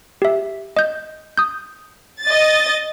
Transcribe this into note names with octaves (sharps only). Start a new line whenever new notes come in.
G4 E5
D#5 G6
D#6 G6
D#5 A6